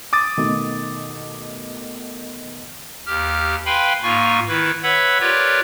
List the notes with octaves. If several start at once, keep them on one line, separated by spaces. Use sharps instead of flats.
D6 D#6 A6
B2 D#3 A3
D#2 G4 F6
B4 F5 G5 G#5 B5 C6
G#2 A#3 F4 G#5 C#6
D#3 E4 B4
B4 C#5 E5 F#5 B5 E6
F4 G4 A#4 B4 C#5 D5